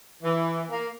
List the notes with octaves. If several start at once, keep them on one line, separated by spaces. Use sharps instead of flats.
E3
A#3